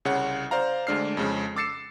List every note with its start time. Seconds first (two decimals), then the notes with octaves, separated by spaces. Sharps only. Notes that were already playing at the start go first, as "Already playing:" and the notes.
0.05 C2 C#3 C#5 F#5
0.51 C5 D5 F5 A#5
0.87 D2 G#3 D4 F6 C7
1.17 F2 C#3 G#3
1.56 D6 E6 A6 C7 C#7 E7